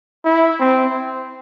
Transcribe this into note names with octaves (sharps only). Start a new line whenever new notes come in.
E4
C4